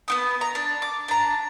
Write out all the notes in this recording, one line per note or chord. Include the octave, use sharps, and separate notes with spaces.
B3 C4 D#6
A#5
D4
D6
D4 A#5